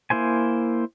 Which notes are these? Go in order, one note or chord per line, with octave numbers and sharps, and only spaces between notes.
A#3 E4 C5 G#5